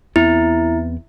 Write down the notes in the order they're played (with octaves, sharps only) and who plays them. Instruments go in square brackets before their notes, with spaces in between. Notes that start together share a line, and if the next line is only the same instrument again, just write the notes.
[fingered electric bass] E2 B3 C4 [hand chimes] E4